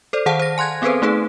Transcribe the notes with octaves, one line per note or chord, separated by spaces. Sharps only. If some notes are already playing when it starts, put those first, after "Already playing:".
A4 C5 D5
D#3 G#4 C5 F5 F#5 A5
C5 A#6
G#5 C6 F#6 G#6
B3 C4 G#4 A4 B4 C5
A3 D#4 G#4 B4